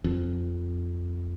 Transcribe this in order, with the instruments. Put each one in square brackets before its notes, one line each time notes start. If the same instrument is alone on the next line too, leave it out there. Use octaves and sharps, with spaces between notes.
[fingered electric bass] F2